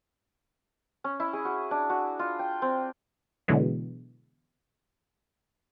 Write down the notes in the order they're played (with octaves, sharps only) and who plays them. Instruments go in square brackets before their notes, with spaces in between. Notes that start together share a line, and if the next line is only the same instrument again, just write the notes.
[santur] C#4
E4
G#4
F#4
D4
F#4
F4
G5
C4
[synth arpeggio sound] B2 D3 E3 F#3 G#3 B3